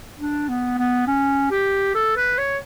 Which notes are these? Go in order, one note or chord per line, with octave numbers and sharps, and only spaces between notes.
D4
B3
B3
C#4
G4
A4
B4
C#5